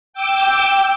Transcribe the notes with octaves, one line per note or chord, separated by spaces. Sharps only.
G5 D6 E6